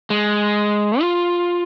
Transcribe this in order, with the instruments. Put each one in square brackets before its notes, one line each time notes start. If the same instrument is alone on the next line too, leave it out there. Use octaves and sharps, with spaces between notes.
[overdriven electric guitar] G#3
F4